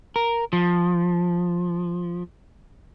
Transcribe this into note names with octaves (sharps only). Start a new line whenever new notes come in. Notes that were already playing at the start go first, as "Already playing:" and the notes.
A#4
F3